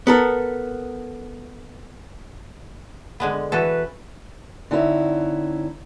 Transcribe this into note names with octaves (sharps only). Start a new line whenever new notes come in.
B3 A4 A#4
D3 G#3 B3
E3 F#4 A4 B4
D3 C4 D#4 E4 C#5